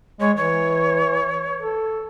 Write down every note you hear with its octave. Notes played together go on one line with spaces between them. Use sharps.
G#3 C#5
E3 C#5
A4